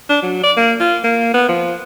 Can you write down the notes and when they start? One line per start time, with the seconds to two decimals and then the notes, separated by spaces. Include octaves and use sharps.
0.09 D4
0.23 F#3
0.43 D5
0.57 A#3
0.80 F4
1.04 A#3
1.34 B3
1.49 F3